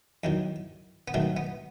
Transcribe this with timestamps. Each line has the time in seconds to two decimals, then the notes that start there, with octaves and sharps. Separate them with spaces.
0.24 E2 D#3 F#3
1.08 B3
1.14 G#2 D#3 F#3 A3
1.37 B3